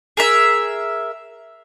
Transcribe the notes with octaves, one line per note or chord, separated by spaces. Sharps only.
G#4 A#4 E5